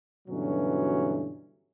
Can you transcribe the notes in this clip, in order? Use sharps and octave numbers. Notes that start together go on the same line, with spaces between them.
G2 B2 D3 E3 F#3 C#4